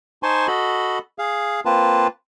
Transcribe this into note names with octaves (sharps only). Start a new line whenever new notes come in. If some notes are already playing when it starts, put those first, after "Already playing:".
D#4 C5 G#5 A5 C6 C#6
F#4 A4 D#5 B5
G#4 F5
A#3 C4 F4 B4 A5